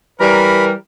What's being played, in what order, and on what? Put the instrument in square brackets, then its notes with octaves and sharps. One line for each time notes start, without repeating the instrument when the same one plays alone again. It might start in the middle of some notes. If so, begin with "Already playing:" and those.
[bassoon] E3 [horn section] G3 A#4 [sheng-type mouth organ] B5